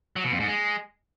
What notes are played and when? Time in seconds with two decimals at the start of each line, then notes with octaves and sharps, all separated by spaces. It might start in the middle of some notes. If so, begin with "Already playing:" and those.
0.16 F#3
0.24 B2
0.32 F2
0.40 G#2
0.48 G#3